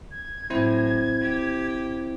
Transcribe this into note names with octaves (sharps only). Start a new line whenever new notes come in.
G#6
A2 F#3 C4 E4 C5
G4